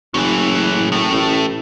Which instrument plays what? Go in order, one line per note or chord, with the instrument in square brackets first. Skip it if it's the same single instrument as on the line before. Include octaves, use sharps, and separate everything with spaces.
[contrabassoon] F#1 [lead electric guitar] A2 E3
[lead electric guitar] A2 A3
[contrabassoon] A1